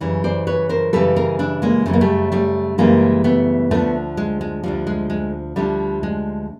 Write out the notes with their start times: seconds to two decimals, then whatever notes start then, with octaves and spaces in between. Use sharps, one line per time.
0.01 F#2 C#3 E3 G3
0.24 C5 D5
0.47 B4 C#5
0.69 A#4 C5
0.93 F#2 C#3 E3 G3 A4 B4
1.16 G#4 A#4
1.39 D4 E4
1.62 G#3 A#3
1.86 F#2 C#3 E3 G3 A3
1.93 A#3
2.01 G3 A3
2.32 G3 A3
2.78 F#2 C#3 E3 G3 G#3 A#3
3.24 A3 B3
3.71 D2 D3 F3 A3 B3
4.17 G#3
4.41 G#3
4.63 D2 D3 F3 G3
4.87 G#3
5.10 G#3
5.56 D2 D3 F3 G3 A3
6.03 G#3